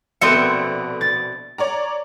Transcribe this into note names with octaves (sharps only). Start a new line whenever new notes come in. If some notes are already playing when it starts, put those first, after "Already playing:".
A#1 B2 B3 C4 A4 E5 D#6 C#7
A6
C#5 D5 A#5